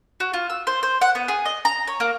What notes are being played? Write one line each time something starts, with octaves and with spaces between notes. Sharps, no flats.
F#4
F4
E6
C5
C5
F#5
B3
G#4
D#5
A#5
C#5
A#3